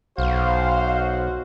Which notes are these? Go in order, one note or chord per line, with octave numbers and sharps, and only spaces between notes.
B1 F#4 C5 F5